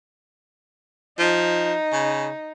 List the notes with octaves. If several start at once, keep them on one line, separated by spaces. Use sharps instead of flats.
F3 D#4
C#3